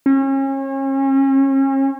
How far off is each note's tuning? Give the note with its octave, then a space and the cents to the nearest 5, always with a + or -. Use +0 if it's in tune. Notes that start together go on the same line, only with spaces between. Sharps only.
C#4 -35